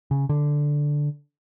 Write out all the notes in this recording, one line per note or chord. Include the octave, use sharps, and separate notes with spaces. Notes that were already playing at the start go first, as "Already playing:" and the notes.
C#3
D3